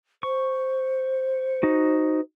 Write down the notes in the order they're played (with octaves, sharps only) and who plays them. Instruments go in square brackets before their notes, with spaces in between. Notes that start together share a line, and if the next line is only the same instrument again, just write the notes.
[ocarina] C5 [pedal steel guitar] C#6
[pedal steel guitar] D#4 F#4